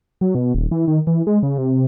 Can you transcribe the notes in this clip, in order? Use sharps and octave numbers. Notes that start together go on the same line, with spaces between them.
F#3
B2
D#1
E3
D#3
E3
G#3
C#3
C3